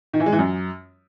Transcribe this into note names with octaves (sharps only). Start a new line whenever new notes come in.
D#3
E3
G#3
E3
F#2